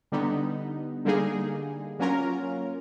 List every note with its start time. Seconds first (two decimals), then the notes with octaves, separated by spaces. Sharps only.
0.12 D3 G3 B3 D#4
1.05 D3 G3 A#3 D#4 G#4
1.99 F#3 A#3 C#4 F4 A#4